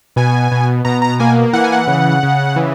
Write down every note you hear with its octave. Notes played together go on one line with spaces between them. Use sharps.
B2 G#5
B2
B2 A#5
A#5
A#3 G#5
E3 F#5
G#5
F#5
C#3
C#3
E3